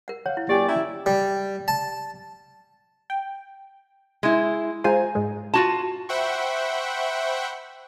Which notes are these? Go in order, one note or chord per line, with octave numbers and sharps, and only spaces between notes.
A#4 F#5
C#5 F5 F#5
E4
F#2 F#3 A#3 G4 D5 G5 G#5
C#4 E4 A#5
G3
A5
G5
G#3 E4
G#3 F4 C5 G#5 A#5
G#2 G#3
F4 F#4 A5
C5 E5 F#5 G5 B5 C#6